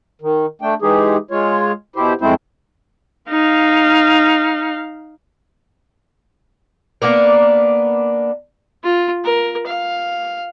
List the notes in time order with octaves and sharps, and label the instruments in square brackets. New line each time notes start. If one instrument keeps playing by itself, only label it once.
[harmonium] D#3
A3 D4 G5
E3 G#3 D#4 G4 G#4
G#3 F4 C#5
B2 E4 G4 C5
F2 G#3 A3 C4 E4 C5
[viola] D#4 F5
[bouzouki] A#3 B3 D4 A#4
[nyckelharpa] F4
A#4
F5